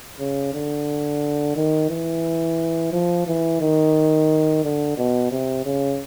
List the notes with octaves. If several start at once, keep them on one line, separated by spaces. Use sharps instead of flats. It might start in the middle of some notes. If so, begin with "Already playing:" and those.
C#3
D3
D#3
E3
F3
E3
D#3
D3
B2
C3
C#3